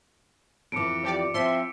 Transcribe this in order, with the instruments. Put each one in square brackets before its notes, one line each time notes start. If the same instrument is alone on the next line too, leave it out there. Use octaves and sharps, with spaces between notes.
[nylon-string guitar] F2 E3 [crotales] D6 C#7 D7
[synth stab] F3 G4 D5
[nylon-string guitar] F3 [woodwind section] C4 E5 [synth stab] C6